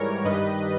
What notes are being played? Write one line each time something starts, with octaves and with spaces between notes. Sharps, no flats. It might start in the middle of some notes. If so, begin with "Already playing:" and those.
Already playing: G#2 E3 G3 A#4 C#5
G2 D#3 G3 B4 D#5